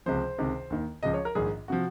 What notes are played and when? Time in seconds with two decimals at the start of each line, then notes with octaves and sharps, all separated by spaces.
0.06 C#2 C3 F3 C5
0.38 C#2 C3 D#3
0.70 D#2 D#3
1.03 C#2 C#3 F3 D#5
1.14 C#5
1.25 A#4
1.35 A#1 G#2 D#3 G#4
1.68 C3 F3 F#4